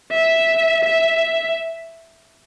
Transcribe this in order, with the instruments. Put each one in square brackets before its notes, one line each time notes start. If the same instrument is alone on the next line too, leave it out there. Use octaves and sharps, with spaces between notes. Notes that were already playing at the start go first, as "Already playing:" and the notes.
[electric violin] E5
E5